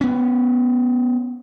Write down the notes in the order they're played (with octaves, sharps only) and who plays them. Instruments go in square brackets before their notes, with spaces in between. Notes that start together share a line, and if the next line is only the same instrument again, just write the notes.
[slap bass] B3 C#4